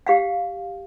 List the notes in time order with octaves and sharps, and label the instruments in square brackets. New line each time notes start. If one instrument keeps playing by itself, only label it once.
[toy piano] G4 F5 F#5